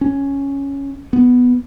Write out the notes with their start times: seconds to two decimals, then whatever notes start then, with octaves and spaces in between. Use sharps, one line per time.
0.01 C#4
1.13 B3